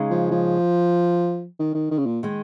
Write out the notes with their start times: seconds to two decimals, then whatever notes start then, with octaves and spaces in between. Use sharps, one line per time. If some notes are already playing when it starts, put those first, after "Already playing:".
Already playing: C#3 G#3 D#4
0.11 F3
0.31 F3
1.59 D#3
1.75 D#3
1.91 D#3
1.98 C#3
2.06 A#2
2.23 D#3 G#3